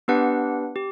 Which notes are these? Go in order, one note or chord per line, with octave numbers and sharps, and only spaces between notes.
B3 D4 G4 B4 F#5
G4